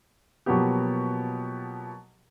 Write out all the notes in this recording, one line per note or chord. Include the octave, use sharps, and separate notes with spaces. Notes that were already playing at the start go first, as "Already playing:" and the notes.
B2 F3 F#3 A#3 B3 G4